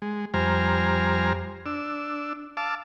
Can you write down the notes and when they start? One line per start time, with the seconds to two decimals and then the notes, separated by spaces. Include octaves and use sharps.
0.02 G#3
0.34 F2 G3 C5 G#5 A#5 F6
1.66 D4 E6
2.57 F5 A5 D6 E6